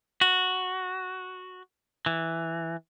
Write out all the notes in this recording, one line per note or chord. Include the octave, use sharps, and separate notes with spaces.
F#4
E3